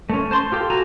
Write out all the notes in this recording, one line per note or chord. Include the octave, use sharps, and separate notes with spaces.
A3 C#4
C5 A5 C6
F4 G4 A4
F#4 A4 G#5 A#5